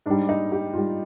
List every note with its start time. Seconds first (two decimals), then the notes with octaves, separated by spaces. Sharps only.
0.06 G#2 G3 D4
0.29 D#4
0.52 G4
0.74 G#2 G3 F4